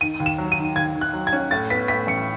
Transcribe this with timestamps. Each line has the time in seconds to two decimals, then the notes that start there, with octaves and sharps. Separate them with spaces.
0.01 D#3 D#7
0.20 D#2
0.26 E7
0.38 F#3
0.52 D#7
0.58 D#3
0.76 D#2 G#6
0.95 D#3
1.01 F#6
1.14 F#3
1.27 G#6
1.33 C#4
1.51 A2 A6
1.70 B3 B6
1.88 A2 B6
2.07 A1 C#7